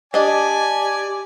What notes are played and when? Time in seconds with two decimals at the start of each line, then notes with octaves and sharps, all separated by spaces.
0.14 D4 G4 D5 D#5 G#5